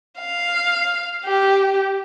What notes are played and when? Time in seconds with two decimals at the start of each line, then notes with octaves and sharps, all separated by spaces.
0.19 F5
1.24 G4